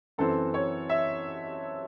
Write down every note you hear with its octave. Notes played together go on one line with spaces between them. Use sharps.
F#2 E3 C4 A4
C#5
E5